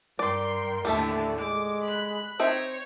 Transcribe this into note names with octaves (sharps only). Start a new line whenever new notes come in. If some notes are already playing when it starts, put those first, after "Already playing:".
G2 A#4 D5 G5 C6
D#2 A2 D3 G3 A3 A4 E5
G#3 D6
B5 F#6
C4 D#4 C5 C#5 E5